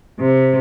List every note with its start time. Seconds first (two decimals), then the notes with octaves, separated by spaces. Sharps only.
0.20 C3